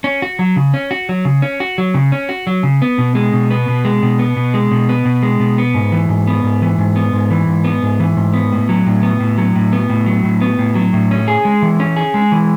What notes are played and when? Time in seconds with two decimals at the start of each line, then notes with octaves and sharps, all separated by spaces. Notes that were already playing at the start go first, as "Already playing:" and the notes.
0.04 C#4
0.22 F#4
0.39 F#3
0.56 C#3
0.74 C#4
0.91 F#4
1.09 F#3
1.25 C#3
1.42 C#4
1.60 F#4
1.78 F#3
1.94 C#3
2.12 C#4
2.29 F#4
2.47 F#3
2.63 C#3
2.82 B3
2.98 B2
3.15 G#3
3.33 B2
3.50 B3
3.68 B2
3.85 G#3
4.03 B2
4.19 B3
4.37 B2
4.54 G#3
4.71 B2
4.89 B3
5.05 B2
5.22 G#3
5.40 B2
5.58 B3
5.74 G#2
5.92 E3
6.09 G#2
6.27 B3
6.44 G#2
6.62 E3
6.78 G#2
6.96 B3
7.13 G#2
7.31 E3
7.48 G#2
7.64 B3
7.83 G#2
8.00 E3
8.17 G#2
8.34 B3
8.52 A2
8.69 F#3
8.86 A2
9.03 B3
9.20 A2
9.38 F#3
9.55 A2
9.73 B3
9.90 A2
10.06 F#3
10.24 A2
10.41 B3
10.59 A2
10.75 F#3
10.93 A2
11.11 C#4
11.28 G#4
11.45 G#3
11.62 E3
11.80 C#4
11.96 G#4
12.14 G#3
12.32 E3